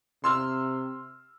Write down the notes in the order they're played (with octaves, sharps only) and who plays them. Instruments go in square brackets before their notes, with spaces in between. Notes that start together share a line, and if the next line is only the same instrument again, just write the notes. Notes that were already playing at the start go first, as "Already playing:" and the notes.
[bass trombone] C3 [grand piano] C6 E6 F6